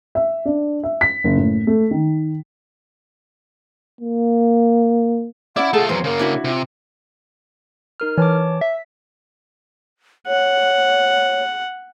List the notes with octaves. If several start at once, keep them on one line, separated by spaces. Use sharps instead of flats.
E5
D4
E5
B6
F#1
A2
A3
D#3
A#3
C#4 E4 D5 F#5
A3 F4 G#4 A4 A5
E2 F#3 B4 C5
C#3 A#3 A#4
D4 E4 F#4
C3 F4
D#4 A#4 F6
E3 C#5 A5 D6
E5 B6
C#5 F#5